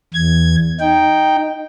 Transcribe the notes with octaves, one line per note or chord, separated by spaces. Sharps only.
E2 G#6
D#4 G5